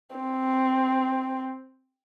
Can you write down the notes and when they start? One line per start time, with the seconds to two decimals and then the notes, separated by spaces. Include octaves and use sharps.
0.16 C4